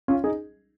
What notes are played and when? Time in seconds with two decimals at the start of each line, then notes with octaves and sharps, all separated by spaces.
0.08 C#4 F4
0.24 D#4 G#4